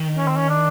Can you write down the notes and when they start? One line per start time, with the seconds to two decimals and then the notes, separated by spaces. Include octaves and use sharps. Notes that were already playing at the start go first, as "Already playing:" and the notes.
Already playing: D#3
0.17 C#4
0.27 C4
0.37 C#4
0.49 D4